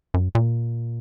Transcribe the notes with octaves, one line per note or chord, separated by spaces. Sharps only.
F#2
A#2